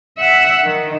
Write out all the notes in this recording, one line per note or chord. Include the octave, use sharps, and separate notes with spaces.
E5 F#5
D#3